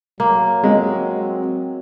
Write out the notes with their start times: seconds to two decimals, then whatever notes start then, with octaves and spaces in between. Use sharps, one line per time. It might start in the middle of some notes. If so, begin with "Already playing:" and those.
0.20 F#3 A#3
0.64 G#3 C4